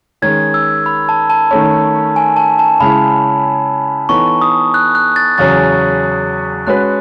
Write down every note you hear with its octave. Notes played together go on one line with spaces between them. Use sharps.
D#3 G#3 C#4 G#4 G#6
E6
B5
A5
A5
D#3 A3 C#4
G#5
A5
A5
C#3 G#3 C#4 E4 B5
E3 B3 D#4 A4 C#5 C#6
D#6
F#6
F#6
A6
E2 C#3 F#3 C#4 G#4 A6
G#3 C#4 F#4 B4 F#6